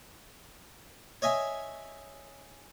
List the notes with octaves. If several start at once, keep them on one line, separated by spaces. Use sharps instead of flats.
C#5 D#5 E5 G#5